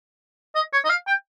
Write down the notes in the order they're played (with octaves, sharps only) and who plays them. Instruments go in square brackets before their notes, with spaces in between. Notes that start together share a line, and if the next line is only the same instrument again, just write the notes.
[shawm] D#5
C#5
D#5
F5
G5